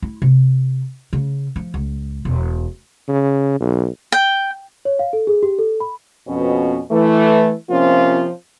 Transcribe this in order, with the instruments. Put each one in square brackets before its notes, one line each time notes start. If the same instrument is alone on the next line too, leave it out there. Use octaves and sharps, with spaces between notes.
[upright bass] E4
C3
C#3
F3
C#2
E1
[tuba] C#3
B1
[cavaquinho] G5
[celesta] C#5
F5
A4
G#4
G4
A4
B5
[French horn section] F2 B2 C#4
E3 A3
C3 F3 A#3 C4 C#4 F4